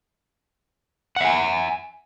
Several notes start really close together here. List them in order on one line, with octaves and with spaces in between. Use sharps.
F#5 E5 G#5